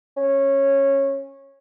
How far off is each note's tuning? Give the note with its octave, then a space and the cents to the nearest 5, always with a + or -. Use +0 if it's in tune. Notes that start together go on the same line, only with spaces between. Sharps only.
C#4 -15